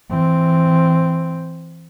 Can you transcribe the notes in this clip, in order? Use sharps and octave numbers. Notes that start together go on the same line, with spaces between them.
E3 C4